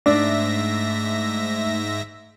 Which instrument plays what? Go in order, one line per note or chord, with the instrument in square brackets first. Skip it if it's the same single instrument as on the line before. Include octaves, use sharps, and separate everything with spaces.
[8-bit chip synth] G#2 E5 A#6 [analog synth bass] A3 [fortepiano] D4